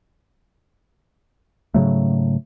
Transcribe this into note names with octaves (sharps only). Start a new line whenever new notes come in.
G#2 C#3 F#3 A3